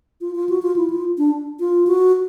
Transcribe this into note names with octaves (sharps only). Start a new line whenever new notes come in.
F4
F4
F#4
F4
E4
F4
D4
F4
F#4